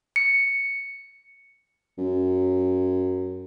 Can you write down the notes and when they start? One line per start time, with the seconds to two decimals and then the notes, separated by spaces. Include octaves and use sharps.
0.16 C#7
1.98 F#2